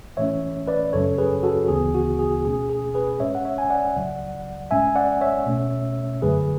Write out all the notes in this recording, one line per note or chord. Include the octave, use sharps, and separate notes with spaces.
A2 E3 A3 C#4 C#5 E5
B4 D5
F#2 C#3 F#3 C#4 A4 C#5
G#4 B4
F#4 A4
D2 C#3 E3 B3 G#4
F#4
G#4
B2 A3 C#4 G#4
G#4
G#4 B4
A2 G#3 C#4 C#5 E5
F#5
C#5 E5
G#5
D5 F#5
C#2 C#3 F#3
A2 G#3 C#4 E5 G#5
D5 F#5
C#5 E5
B2 A3 C#4
F#2 D3 F#3 A3 G#4 B4